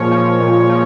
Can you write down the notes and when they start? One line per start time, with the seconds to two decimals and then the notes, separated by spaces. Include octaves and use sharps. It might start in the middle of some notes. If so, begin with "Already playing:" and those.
Already playing: A#2 F3 G#3 C#5
0.11 F3
0.40 A#2
0.69 F3